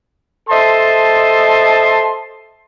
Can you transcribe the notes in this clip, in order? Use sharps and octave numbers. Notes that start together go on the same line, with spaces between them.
A4 C5 D#5 E5 A5 C6